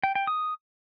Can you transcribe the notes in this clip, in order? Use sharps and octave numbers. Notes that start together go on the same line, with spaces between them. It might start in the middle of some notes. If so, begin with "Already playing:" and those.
G5
G5
D#6